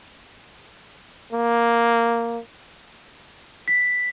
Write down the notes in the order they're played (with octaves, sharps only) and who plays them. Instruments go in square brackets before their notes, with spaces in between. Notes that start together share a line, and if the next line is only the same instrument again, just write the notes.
[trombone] A#3
[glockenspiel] B6